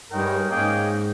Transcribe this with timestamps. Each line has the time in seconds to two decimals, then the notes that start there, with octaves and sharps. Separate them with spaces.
0.10 G2 G#3 D#4 A#4 C#5 G5
0.50 G#2 A#3 C#4 G#4 D#5 G5